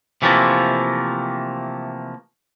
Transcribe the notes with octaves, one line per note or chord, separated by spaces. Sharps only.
C3 E3 F3 A3 A#3